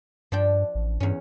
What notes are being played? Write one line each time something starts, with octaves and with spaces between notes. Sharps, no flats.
G2 F3 D4 G5
A1
E2 G2 C#4